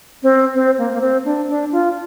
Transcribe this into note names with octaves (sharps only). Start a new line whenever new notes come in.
C4
C4
A#3
A#3
C4
D4
D4
F4